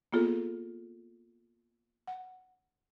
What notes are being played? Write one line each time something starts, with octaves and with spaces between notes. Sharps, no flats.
A#3 B3 F4 G#4 A4
F#5